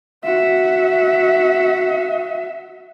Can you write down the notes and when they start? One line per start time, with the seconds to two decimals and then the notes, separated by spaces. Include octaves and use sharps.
0.24 F#4 E5